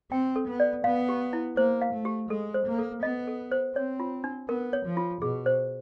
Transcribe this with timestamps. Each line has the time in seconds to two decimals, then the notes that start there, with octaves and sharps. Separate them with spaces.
0.11 C4 G5
0.36 A4
0.48 B3
0.60 D5
0.84 B3 F5
1.09 G4
1.33 E4
1.57 A#3 C5
1.82 F5
1.93 A3
2.05 G4
2.29 G#3 A4
2.54 C5
2.66 A#3
2.79 A4
3.03 B3 D#5
3.27 A4
3.52 C5
3.75 C4 C#5
4.00 F4
4.24 D4
4.48 B3 A#4
4.73 C#5
4.85 F3
4.97 F4
5.22 B2 G#4
5.46 C5